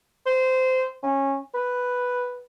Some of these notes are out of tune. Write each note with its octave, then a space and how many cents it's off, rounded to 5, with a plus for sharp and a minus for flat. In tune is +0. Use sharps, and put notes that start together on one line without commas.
C5 -20
C#4 -20
B4 +0